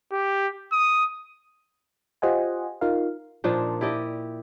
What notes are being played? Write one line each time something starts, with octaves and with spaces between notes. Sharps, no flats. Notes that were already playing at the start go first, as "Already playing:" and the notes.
G4
D#6
F4 G4 C5 D#5 F#5 G#5
D#4 F4 A#4 F5
A#2 F3 D4 D#4
E4 G4 D5 D#5